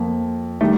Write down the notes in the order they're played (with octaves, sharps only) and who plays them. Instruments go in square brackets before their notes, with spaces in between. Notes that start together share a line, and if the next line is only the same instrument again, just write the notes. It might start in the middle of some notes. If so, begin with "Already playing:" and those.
Already playing: [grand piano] F2 [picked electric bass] A#3
[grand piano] D#3 G3 [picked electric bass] A3